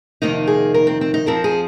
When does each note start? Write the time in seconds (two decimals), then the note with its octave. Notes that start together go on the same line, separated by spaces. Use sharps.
0.22 F2 C3 D#3 A#3 D#4
0.47 G#4
0.74 A#4
0.87 C4
1.01 C4
1.14 D#4
1.26 F2 F3 C4 A#4
1.44 G#4